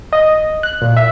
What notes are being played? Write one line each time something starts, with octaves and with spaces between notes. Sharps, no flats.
D#5
F#6
A#2
E5